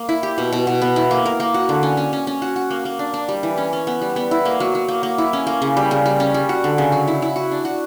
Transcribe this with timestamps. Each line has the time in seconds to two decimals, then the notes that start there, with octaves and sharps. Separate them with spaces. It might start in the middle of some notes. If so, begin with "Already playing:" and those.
Already playing: A#3
0.09 E4
0.23 G4
0.38 B2
0.52 B2
0.67 B2
0.82 B3
0.96 E4
1.11 A#3
1.26 A#4
1.40 A#3
1.54 F#4
1.69 D3
1.83 C#4
1.97 C#4
2.13 C#4
2.27 C#4
2.42 F#4
2.56 F#4
2.70 A#3
2.85 A#3
2.99 D4
3.14 D4
3.29 G3
3.43 E3
3.57 C#4
3.73 C#4
3.87 B3
4.02 G3
4.16 B3
4.31 E4
4.45 A#3
4.60 F#3
4.75 F#3
4.88 A#3
5.03 A#3
5.18 E4
5.33 C#4
5.47 A#3
5.62 C#3
5.77 G3
5.91 C#3
6.06 G3
6.20 C#4
6.34 G3
6.49 F#4
6.64 D3
6.78 C#3
6.92 F#3
7.08 E4
7.22 E4
7.36 F#4
7.51 D4
7.65 F#4